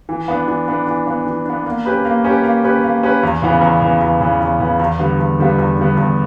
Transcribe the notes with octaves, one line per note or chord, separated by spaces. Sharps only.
E3
B3 D4
E3
B3 D4
E3
B3 D4
E3
B3 D4
A#3
C#4 G4 B4
A#3
C#4 G4 B4
A#3
C#4 G4 B4
A#3
C#4 G4 B4
E2
C#3 E3 B3
E2
C#3 E3 B3
E2
C#3 E3 B3
E2
C#3 E3 B3
E2
D3 G3 B3
E2
D3 G3 B3
E2
D3 G3 B3
E2